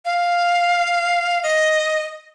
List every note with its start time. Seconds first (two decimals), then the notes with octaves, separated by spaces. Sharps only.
0.05 F5
1.43 D#5